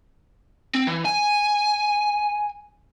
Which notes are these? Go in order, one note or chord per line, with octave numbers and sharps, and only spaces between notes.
C4
E3
G#5